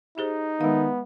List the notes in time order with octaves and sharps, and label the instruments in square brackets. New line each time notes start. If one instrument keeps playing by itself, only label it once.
[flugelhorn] D#4 [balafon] G4 G#4 C5
[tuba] D#3 [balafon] G#3 F5 [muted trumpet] B3